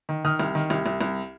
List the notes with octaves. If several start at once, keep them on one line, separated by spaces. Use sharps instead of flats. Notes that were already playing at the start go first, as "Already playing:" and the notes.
D#3
D#3 D#6 F6
C2
D#3
C2
C2
C2